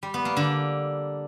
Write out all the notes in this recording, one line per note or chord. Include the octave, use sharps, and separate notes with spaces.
G3
B3
A#3
D3